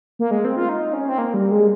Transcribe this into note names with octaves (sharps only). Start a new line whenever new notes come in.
A#3
G#3
C4
F4
D#4
C#4
C4
A#3
G3
G#3